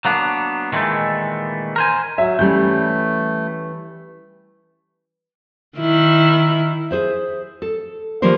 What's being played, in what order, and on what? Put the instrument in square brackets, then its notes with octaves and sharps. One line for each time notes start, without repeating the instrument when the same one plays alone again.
[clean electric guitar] F#3 A#3 B3 D4
A#2 D#3 E3 F#3 G#3 A3
A#4 C5 G#5
[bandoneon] F#3 [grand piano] E5
[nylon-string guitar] E3 G3 C#4 [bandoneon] A3 [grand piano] G6
[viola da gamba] D#3 E4
[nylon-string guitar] G#4 C5 E5
A4
D#3 F3 G3 A#3 A#4 C5